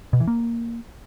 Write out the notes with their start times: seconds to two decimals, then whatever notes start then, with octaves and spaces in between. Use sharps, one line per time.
0.13 B2
0.20 E3
0.28 A#3